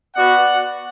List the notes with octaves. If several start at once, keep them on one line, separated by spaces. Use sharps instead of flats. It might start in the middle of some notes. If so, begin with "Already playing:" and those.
B3 F#4 D5 F#5